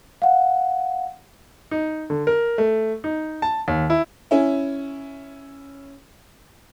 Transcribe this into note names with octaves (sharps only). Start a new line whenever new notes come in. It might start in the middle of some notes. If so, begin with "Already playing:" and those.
F5 F#5
D#4
D3
A#4
A3
D#4
A5
D#2
E4
C#4 E4